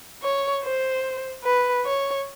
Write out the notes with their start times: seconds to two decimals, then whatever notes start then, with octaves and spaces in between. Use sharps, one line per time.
0.22 C#5
0.63 C5
1.44 B4
1.85 C#5